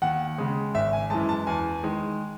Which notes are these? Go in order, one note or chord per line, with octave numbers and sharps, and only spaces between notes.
D#2 F#5
C#3 G#3
G#1 E5
G#5
F#2 E3 G#3 A5
A5
E2 G#5
D#3 G#3